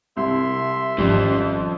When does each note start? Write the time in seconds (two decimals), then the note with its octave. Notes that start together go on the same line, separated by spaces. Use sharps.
0.17 C2 E5 C6
0.98 G#1 F2 G3 C#4